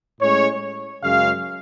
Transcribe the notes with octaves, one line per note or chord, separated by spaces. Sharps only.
A2 G#3 C#4 C#5
F#2 C#3 G#3 C#4 F5